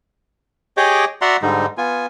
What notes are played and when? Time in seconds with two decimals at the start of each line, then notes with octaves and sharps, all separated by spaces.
0.77 G4 G#4 C#5 D#5 G5 D6
1.21 F#4 D5 E5 F#5 A#5 C6
1.42 G#2 D3 G3 D#4
1.78 B3 F4 G#5